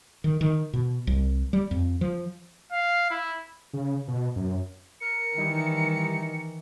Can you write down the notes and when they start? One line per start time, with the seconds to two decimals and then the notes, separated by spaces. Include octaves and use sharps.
0.24 D#3
0.41 D#3
0.73 B2
1.07 C2
1.53 G3
1.71 F2
2.01 F3
2.72 F5
3.10 E4
3.73 C#3
4.08 B2
4.36 F#2
5.01 A#4 C#7
5.37 D#3 E3 G3 D#4 E4